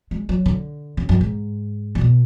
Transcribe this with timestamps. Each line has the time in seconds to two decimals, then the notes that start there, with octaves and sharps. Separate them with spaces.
0.11 G#3
0.29 F#3
0.46 D3
0.97 C#3
1.09 F#2
1.21 G#2
1.95 A2
2.01 B2